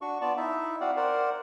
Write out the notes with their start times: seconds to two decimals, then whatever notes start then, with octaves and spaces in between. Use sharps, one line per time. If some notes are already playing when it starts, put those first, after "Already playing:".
0.01 D4 F#4 C#6
0.21 B3 F4 D5 A5
0.37 D#4 E4 E5
0.81 C4 F#4 D5 F5 F#5
0.96 A#4 C5 D5 F#5